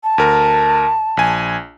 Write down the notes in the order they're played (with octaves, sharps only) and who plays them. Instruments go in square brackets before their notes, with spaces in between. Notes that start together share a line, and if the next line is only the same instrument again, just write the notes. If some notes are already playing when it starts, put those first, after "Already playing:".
[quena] A5
[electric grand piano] D2 A#4
A#1 G#5